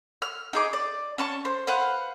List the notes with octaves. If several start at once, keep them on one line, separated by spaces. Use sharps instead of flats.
F6
D#4 G#4 D6
D5
C#4 A5 C#6
C5
B4 C5 F5 F#5